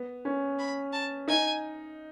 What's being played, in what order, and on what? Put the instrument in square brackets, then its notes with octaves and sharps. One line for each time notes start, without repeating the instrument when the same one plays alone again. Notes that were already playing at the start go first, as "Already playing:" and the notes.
Already playing: [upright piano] B3
C#4
[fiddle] B5
A5
[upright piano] D#4 [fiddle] G#5